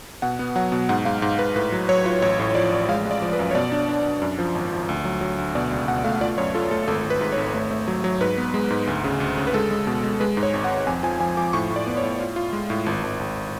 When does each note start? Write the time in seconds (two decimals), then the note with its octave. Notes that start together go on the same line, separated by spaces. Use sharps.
0.22 B2 F#5
0.39 B3
0.56 F#3 F#5
0.72 B2
0.89 G#2 F#5
1.05 G#2 F5
1.22 G#2
1.39 G#2 B4
1.56 A2 B4
1.72 F#3
1.89 F#3 C#5
2.06 F4
2.22 A1 C#5
2.39 A2
2.55 F3 D5
2.72 A1
2.89 G#3 F5
3.05 G#3
3.11 D5
3.22 F3
3.33 B4
3.39 F#2
3.51 C#5
3.55 B2 D5
3.72 D4
3.89 D4
4.06 D4
4.22 F#2
4.38 F3
4.55 G#1
4.71 F3
4.89 D2
5.05 F#3
5.21 F#3
5.38 D2
5.55 B2 D5
5.71 C#2
5.88 B2 F#5
6.04 A3 F5
6.21 F4 D5
6.38 F#2 C#5
6.55 F4 A4
6.71 A3 A4
6.88 G#1 A4
7.04 G#1
7.10 B4
7.21 G#2
7.32 C#5
7.37 G#1
7.54 A3
7.71 A3
7.88 F#3
8.04 F#3
8.21 G#2 B4
8.37 B3
8.54 G#3
8.70 G#2
8.87 D2
9.04 C#3
9.20 D2
9.37 C#3
9.47 B4
9.54 G#3 A4
9.71 G#3
9.87 B2
10.04 G#3
10.20 G#3 B4
10.37 G#2
10.43 C#5
10.54 G#1
10.64 F#5
10.71 G#1
10.87 F2 G#5
11.03 F3 G#5
11.20 F3 G#5
11.37 F3 D6
11.53 A2 C#6
11.70 A2
11.76 D5
11.87 B3
11.97 C#5
12.04 A2
12.21 F4
12.36 F4
12.53 G#3
12.70 A2
12.86 G#1
13.04 G#1
13.19 G#1